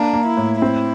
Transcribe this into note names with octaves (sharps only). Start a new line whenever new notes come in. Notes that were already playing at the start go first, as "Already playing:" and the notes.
Already playing: A#3 D4
A#3
E4
A2
C4 E4